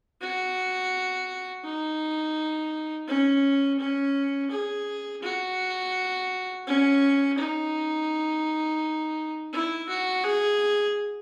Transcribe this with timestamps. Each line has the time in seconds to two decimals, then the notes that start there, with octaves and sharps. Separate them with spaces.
0.21 F#4
1.64 D#4
3.07 C#4
3.79 C#4
4.51 G#4
5.22 F#4
6.66 C#4
7.38 D#4
9.53 E4
9.89 F#4
10.24 G#4